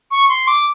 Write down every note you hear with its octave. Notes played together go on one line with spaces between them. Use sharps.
C#6
C6
D6